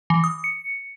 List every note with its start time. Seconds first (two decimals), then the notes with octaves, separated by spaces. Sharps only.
0.10 E3
0.24 D#6
0.44 C#7